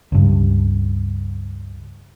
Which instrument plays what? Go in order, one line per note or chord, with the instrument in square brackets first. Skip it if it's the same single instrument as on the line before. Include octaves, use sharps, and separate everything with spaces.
[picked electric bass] C#2 G2